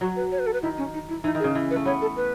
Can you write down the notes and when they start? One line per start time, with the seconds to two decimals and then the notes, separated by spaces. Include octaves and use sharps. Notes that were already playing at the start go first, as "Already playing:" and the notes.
0.01 F#3 F#4
0.16 B4
0.32 C#5
0.39 B4
0.46 A4
0.53 B4
0.62 D#3 E4
0.78 C#4
0.94 D#4
1.08 E4
1.24 E3 D#4
1.35 D#3
1.40 G#4
1.44 C#3
1.55 E3
1.70 B4
1.76 A3
1.85 B3 C#5
2.01 A4
2.16 B4